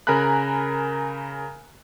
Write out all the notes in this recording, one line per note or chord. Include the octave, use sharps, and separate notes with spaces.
C#3 A#4 G#5 A#5 B5 F#6